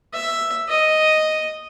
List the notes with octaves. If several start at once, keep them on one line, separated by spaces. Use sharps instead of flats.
E5
D#5